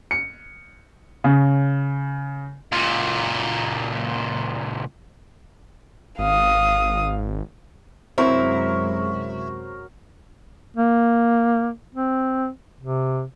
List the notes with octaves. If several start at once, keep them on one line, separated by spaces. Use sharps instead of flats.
C#7
C#3
C#2 A#2
G#1 F5 D#6
F#2 C3 F#3 G#3 C4 E4 A#4 C#6
A#3
C4
C3